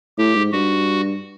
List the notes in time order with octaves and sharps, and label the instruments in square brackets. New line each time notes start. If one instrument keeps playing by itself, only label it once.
[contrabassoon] A2 [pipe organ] G4
[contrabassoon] G#2
[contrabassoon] G2 [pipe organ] F#4